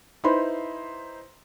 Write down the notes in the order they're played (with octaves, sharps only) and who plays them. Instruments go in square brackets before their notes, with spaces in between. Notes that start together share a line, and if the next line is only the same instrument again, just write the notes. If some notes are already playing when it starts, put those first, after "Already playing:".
[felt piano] D#4 E4 B4 C5 B5 C6